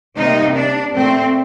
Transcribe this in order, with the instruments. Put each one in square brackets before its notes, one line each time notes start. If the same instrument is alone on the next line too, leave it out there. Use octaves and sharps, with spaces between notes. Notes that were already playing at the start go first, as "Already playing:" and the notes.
[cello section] C3 G3 A#3 D#4
D4
A#2 A3 C4